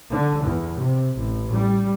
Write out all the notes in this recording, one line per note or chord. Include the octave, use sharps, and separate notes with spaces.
D3
E2
C3
A1
G3